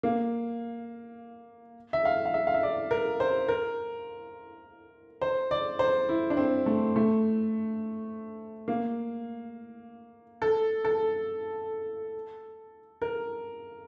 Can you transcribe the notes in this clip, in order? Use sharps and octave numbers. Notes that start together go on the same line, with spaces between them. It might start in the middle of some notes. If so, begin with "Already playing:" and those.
A#3
E5
F5
F5
E5
F5
E5
D5
A#4
C5
A#4
C5
D5
C5
E4
D4
C4
A3
A3
A#3
A4
A4
A#4